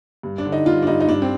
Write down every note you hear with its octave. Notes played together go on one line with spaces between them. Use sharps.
G2
D4
D3
D#4
G2 F4
D4
G2 D#4
D#4
G2 D4
C4